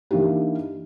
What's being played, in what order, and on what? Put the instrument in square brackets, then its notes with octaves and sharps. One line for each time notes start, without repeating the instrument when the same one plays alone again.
[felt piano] E3 A#3 D4 D#4 G4